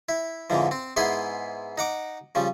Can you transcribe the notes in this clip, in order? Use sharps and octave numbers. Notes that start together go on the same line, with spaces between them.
E4
F2 G#2 D3 E3 F3
C4
G#2 B3 E4 G#4 C6
D#4 F#5 D6
C#3 F3 G3